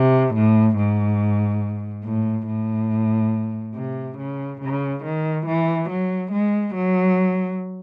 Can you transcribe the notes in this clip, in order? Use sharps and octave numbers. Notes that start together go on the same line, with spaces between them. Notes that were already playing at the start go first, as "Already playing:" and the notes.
Already playing: C3
A2
G#2
A2
A2
C3
C#3
C#3
D#3
E3
F#3
G#3
F#3